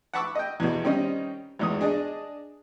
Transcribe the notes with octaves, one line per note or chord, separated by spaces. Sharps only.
F#5 A5 B5 C#6 D6 E6
D#5 G5
E2 B2
D#3 G3 C4 C#4 D#5
G#1 E2 D#6
D4 G#4 D5 D#5